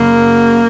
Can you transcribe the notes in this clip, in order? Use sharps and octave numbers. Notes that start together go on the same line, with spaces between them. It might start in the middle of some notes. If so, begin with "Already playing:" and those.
Already playing: F#2 C#3 A#3